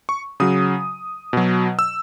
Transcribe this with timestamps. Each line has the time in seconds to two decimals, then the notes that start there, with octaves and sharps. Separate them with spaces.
0.09 C#6
0.40 C#3 F#3 D#6
1.33 B2 F#3
1.79 E6